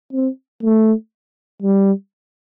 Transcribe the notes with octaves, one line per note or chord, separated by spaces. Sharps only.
C4
A3
G3